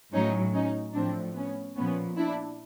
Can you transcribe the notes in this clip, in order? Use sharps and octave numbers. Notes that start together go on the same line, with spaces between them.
A2 F#3 C#4 D#4
C#4 D#4
A2 F3 C4 D4
B3 C#4
A#2 F3 B3 C#4
D4 E4